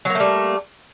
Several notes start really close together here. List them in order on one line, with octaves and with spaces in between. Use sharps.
F#3 A#3 A3 G3